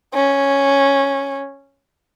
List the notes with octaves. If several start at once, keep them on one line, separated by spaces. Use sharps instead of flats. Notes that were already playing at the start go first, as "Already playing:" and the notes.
C#4